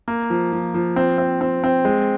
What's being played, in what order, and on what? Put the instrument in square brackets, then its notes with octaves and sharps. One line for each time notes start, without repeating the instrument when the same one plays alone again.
[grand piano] A#3
F3
F3
F3
C4
C4
C4
C4
G#3